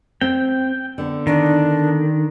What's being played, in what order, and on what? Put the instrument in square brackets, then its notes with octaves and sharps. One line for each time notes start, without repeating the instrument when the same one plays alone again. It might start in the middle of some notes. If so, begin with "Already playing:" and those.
[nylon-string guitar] C4 [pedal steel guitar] G5
[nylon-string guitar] D3 B3
[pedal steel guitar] D#3 [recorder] D4